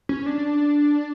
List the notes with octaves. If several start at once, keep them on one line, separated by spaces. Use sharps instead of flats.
C#4
D4